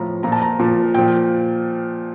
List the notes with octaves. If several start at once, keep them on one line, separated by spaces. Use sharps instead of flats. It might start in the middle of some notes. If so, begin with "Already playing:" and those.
Already playing: A2 F3 A#5
A#2 F3 A#5
A5
A#5
A#2 F3
A#2 F3 G5